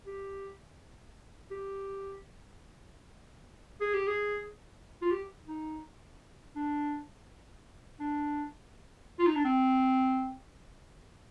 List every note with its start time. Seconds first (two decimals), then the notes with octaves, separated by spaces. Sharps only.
0.06 G4
1.51 G4
3.81 G#4
3.94 G4
4.08 G#4
5.02 F4
5.11 G4
5.48 D#4
6.56 D4
8.00 D4
9.19 F4
9.27 D#4
9.35 D4
9.45 C4